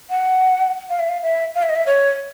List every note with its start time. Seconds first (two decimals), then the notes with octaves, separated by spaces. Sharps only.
0.10 F#5
0.90 F5
0.99 E5
1.09 F5
1.23 E5
1.55 F5
1.62 E5
1.69 D#5
1.76 E5
1.87 C#5